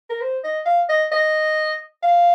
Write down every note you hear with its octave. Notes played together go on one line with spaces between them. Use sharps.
A#4
C5
D#5
F5
D#5
D#5
F5